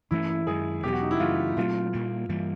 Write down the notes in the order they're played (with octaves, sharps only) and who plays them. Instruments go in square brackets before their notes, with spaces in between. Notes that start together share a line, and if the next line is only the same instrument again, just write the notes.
[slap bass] G2 E3 A3 C#4 [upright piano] E4
[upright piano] E4
[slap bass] F#2 D#3 G#3 [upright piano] G#4
[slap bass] E2 B2 F#3 [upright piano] G4
[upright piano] F#4
D#4
E4
[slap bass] F#2 C#3 E3 A3 [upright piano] F4
[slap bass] A#2 F#3 A3 C4 [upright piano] F4
[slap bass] A#2 G3 A#3
G2 E3 G3 A#3